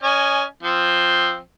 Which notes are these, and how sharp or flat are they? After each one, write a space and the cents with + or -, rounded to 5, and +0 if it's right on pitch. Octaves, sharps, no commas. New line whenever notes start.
C#4 +10 D#5 -20 G#5 +0
F3 +0 C4 +0